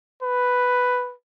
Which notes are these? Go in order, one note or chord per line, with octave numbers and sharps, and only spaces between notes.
B4